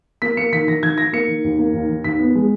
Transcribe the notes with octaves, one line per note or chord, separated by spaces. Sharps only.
A#3 B6
A#3 C#7
D#3 B6
D#3 A#6
D#3 G#6
D#3 A#6
A#3 C#7
D#3
D#2
A#3
D#2
D#3
D#2 B6
B3
G#3